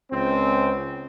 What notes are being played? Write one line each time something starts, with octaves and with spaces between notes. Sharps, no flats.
C#2 C4